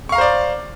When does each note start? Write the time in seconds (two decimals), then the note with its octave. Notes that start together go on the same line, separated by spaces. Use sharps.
0.09 C#6
0.12 F5
0.15 A#5
0.18 C5
0.21 D5